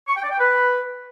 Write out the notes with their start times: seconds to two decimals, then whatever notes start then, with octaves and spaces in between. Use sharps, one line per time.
0.08 C#6
0.16 G5
0.24 D5
0.31 G5
0.39 B4